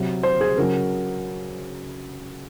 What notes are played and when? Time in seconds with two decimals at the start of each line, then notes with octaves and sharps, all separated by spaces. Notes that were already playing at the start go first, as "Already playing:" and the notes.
Already playing: C3 F#3
0.23 C5
0.41 G#4
0.58 C#3 F#3 A#4